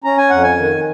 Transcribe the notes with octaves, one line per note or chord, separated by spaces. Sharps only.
C#4 A#5
G#5
F2 F#5
G#5
D#3